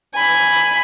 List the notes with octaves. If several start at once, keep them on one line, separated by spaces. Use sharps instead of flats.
G#5 B5